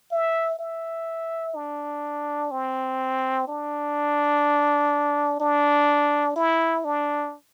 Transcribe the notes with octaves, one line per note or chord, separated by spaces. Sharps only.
E5
E5
D4
C4
D4
D4
E4
D4